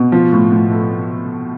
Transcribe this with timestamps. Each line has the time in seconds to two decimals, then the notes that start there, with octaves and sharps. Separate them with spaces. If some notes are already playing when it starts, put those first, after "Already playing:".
Already playing: B2
0.12 F3
0.33 A2
0.52 A2
0.71 A3